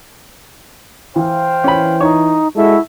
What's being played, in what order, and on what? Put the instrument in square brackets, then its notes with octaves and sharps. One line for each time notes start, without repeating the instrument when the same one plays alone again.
[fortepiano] E3 [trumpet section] C5 F5 G5
[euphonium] E3 [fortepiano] C#4 B5
[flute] D#4 [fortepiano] C#5
[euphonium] G#3 [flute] E4 [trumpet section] F#4 A4 E5